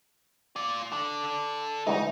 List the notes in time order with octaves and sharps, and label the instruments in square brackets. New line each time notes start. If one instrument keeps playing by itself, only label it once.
[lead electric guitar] F4 D5
A4 D5
[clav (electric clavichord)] D2 E3 G#3 [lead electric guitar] D#4